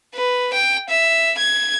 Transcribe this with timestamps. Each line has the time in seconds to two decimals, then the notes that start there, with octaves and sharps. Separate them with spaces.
0.15 B4
0.54 G5
0.89 E5
1.38 G#6